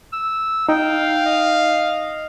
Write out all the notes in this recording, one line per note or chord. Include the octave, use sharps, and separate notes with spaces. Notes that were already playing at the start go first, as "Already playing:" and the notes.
E6
D#4 F5 G5
D#5